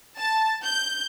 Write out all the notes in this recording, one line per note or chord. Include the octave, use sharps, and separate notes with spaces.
A5
G6